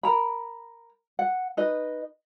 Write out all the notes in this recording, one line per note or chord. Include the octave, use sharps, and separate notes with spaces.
A#4 A#5 B5
F#5
D#4 B4 D#5